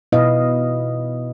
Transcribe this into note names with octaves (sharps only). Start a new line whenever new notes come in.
B2 E4 B4 D#5 F5